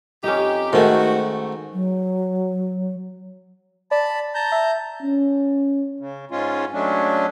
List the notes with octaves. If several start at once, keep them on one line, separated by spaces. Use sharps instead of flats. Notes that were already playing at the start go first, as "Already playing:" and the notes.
F2 C#4 D#4 G4
G#2 D#3 A3 F#4
F#3
D5 A5 B5
A5 A#5 G6
E5
C#4
C#3
G#2 G#3 C#4 F4
F#3 G#3 A3 C#4 D4